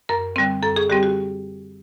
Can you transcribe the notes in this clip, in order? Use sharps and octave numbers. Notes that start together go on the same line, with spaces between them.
F#2 A#4
D3 G3 C4
F#2 A4
G#4
D3 G3 C4 G4
F#4